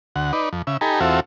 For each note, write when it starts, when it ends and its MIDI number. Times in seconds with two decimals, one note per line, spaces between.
0.16 0.32 38
0.16 0.32 78
0.33 0.49 63
0.33 0.49 71
0.33 0.49 74
0.53 0.62 41
0.67 0.77 49
0.67 0.77 76
0.81 1.00 63
0.81 1.00 67
0.81 1.00 69
0.81 1.00 80
0.81 1.00 82
0.81 1.00 83
1.00 1.20 40
1.00 1.20 60
1.00 1.20 65
1.00 1.20 66
1.00 1.20 69
1.00 1.20 76